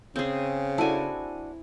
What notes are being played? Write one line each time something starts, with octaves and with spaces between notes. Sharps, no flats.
C#3 C4 G#4
D4 E4 F#4 A4 G#5